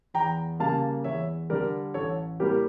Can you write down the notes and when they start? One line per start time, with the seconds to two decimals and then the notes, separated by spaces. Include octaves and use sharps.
0.14 E2 G5 A#5
0.60 C#3 G3 A#3 F5 A5
1.04 E2 C#5 E5
1.50 D3 G3 A#4 D5
1.94 A1 A4 C#5
2.40 A2 G3 A#3 G4 A#4